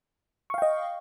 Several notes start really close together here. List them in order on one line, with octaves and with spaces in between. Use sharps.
C#6 F5 G5 D#5